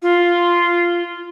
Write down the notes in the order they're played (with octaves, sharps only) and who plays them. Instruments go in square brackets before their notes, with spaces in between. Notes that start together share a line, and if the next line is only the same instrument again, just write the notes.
[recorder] F4